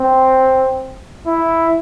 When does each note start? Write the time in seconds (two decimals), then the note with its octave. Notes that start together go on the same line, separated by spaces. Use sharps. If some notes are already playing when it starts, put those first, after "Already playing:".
Already playing: C4
1.26 E4